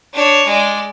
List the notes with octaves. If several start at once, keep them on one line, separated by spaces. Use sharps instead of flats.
D4 C#5
G#3 D5